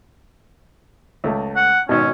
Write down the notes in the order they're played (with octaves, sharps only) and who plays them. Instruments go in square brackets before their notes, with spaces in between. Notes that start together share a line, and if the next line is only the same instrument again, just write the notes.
[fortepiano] C#2 A3
[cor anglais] F#5
[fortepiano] G#1 B2 [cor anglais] C#4